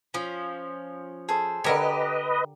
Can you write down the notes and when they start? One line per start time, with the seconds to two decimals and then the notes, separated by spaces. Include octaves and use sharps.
0.14 F3 C#4
1.29 G#4 A4 C5
1.64 D3 G4 A#4 B4 C#5 D#5